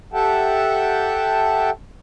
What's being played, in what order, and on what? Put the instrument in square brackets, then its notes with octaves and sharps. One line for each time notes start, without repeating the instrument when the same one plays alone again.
[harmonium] G4 A4 E5 F#5 G5 A5